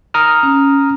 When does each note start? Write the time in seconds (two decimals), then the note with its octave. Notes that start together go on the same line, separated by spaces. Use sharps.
0.14 A#5 D#6 F6
0.43 C#4